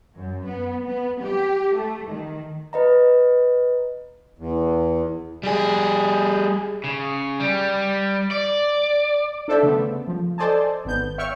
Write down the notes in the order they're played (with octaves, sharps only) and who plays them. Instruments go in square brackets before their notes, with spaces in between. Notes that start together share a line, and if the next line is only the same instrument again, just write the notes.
[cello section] F#2
B3
B3
G4
A3
D#3
[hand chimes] B4 D#5 A#5
[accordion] E2
[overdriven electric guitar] G3 G#4
C#3
G3
D5
[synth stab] D4 A4 C5 D5 E5
C#3 A3 B3
F3
A4 C5 D5 D#5 G#5 A5
G#1 B3 G6
C#5 E5 G5 C#6 F6 C#7